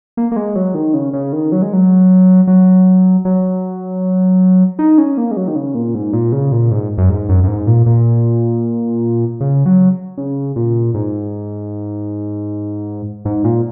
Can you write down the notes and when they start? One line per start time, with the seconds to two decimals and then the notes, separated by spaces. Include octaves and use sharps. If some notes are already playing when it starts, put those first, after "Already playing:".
0.17 A#3
0.32 A#3
0.36 G#3
0.55 F#3
0.75 D#3
0.94 C#3
1.13 C#3
1.33 D#3
1.52 F#3
1.62 G#3
1.73 F#3
2.47 F#3
3.25 F#3
4.79 D#4
4.98 C#4
5.18 A#3
5.31 G#3
5.37 F#3
5.48 D#3
5.55 C#3
5.75 A#2
5.94 G#2
6.13 A#2
6.32 C#3
6.52 A#2
6.71 G#2
6.98 F#2
7.09 G#2
7.29 F#2
7.44 F#2
7.48 G#2
7.67 A#2
7.86 A#2
9.41 C#3
9.66 F#3
10.17 C#3
10.56 A#2
10.94 G#2
13.25 G#2
13.44 A#2